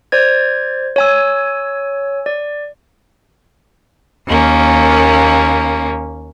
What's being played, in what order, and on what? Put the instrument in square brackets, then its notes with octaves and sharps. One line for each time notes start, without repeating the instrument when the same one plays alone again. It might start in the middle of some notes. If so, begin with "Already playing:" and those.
[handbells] C5 D5 G#6
C#5 G#5 E6
D5
[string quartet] D#2 A#3 C#4